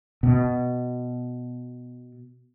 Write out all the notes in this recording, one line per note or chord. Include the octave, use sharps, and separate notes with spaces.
B2